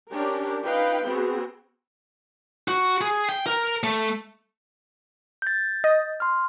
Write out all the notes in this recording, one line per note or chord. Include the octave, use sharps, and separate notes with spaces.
C#4 D4 G4 A#4
D#4 F4 B4 F5 G5
B3 C4 F#4 G#4
F#4
G#4
G5
A#4
A3
G6 A6
D#5
C6 F6